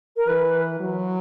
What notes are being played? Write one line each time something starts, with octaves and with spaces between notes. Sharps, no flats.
A#4
E3 B4
F#3